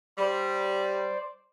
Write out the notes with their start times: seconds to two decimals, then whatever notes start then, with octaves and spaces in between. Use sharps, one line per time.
0.18 G3 C5 D5